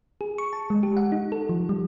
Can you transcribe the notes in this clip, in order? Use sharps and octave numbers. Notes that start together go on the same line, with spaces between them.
G#4
C#6
A5
G#3
G4
F#5
D#4
A4
F3
G3